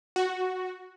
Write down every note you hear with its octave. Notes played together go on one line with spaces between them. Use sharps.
F#4